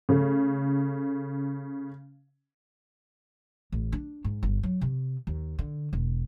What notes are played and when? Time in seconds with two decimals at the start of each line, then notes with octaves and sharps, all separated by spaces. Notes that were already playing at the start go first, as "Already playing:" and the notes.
0.09 C#3 A3
3.72 A1
3.92 D4
4.24 G#2
4.43 G1
4.63 F#3
4.81 C3
5.27 D#2
5.59 D3
5.93 E1